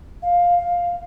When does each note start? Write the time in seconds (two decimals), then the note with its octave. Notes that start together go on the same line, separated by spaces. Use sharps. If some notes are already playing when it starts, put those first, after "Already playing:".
0.22 F5
0.59 F5